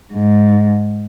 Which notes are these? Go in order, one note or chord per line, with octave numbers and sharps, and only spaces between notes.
G#2